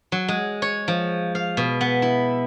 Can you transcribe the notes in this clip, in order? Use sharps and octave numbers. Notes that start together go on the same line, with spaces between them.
F#3
G#3
C#5
F3
F5
B2
B3
E4